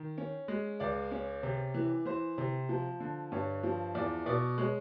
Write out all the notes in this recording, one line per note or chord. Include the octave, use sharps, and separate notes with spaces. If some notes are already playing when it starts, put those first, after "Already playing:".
Already playing: D#3
C#4
G#3
C#2 D5
C#4
C3
E3
E3 C5
C3
F3
D3
G2 C#5
F3
E2 D5
B2 D5
G#3 C#5